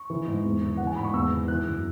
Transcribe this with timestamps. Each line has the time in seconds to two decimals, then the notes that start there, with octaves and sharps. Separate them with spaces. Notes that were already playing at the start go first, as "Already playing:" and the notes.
Already playing: C#6
0.10 E3
0.27 G#2
0.44 E2
0.63 E3
0.77 E3 F#5
0.87 G#5
0.96 G#2 B5
1.04 C#6
1.13 E2 E6
1.31 E3
1.48 E3 F#6
1.66 F#2